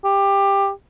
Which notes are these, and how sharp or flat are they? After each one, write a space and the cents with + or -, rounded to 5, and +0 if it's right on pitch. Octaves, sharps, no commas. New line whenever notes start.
G4 +15